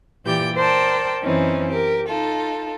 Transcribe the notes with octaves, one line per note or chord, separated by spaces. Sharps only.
A#2 E3 G4 D5 G5 G6
A#4 C5 D5 G5 A5
F#2 E3 C4 C#4 D#4
G4 A#4
D#4 F4 A4